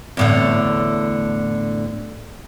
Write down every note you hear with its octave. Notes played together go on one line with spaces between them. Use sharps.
E2 A2 D3